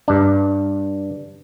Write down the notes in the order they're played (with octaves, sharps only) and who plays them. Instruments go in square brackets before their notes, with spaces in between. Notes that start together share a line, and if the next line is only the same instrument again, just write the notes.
[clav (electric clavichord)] G2 D4